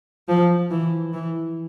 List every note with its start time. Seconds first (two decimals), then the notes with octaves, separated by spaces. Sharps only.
0.28 F3
0.71 E3
1.13 E3